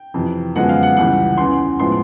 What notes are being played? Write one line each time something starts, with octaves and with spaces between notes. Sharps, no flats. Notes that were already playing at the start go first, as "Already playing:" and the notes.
Already playing: G5
F2 C3 E3
F#2 D3 F3 G#3 B3 F#5
F5
F#5
C#2 C#3 E3 G3 F#5
E2 C#3 E3 C6
A2 F3 G#3 B3 C6